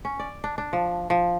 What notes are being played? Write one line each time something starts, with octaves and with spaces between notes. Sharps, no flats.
C#4
D5
D4
D4
F3
F3